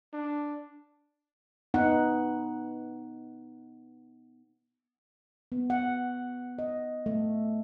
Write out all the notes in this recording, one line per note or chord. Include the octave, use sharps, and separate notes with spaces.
D4
B3 D#4 F#5
B3
F#5
D#5
A3